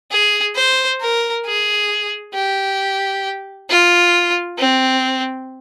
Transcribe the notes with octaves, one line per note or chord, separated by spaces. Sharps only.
G#4
C5
A#4
G#4
G4
F4
C4